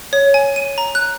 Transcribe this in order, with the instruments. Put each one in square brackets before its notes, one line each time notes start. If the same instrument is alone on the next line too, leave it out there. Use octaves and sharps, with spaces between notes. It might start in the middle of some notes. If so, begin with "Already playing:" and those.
[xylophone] C#5
G#5
D#7
A#5
F#6